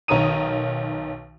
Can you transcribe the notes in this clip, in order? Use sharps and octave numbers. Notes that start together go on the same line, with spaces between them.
B1 D#3 C#5 A#5 D#6 D#7